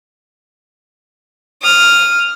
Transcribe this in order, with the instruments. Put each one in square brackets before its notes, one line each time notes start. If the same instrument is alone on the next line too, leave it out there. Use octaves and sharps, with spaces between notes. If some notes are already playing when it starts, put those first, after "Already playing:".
[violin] D#6 F6